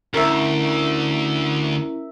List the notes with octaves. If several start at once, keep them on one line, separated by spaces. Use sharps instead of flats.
D2 C#4 E4 A#4 E5